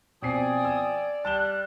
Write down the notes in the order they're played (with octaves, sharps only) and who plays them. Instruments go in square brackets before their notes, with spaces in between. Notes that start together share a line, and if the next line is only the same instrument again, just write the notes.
[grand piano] B2 C4 C7 [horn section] F3 G5 G#5 [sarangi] D5 [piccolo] D#6
[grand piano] E6
[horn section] G3 [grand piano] A5 E7 G7 [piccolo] F#6